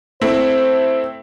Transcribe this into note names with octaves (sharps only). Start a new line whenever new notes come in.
A3 C4 E4 C5